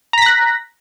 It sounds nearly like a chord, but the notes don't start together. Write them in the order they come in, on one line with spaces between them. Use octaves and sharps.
A#5 B6 A#6 F#6